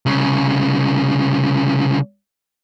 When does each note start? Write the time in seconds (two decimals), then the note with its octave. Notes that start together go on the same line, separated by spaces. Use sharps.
0.06 C2 C#3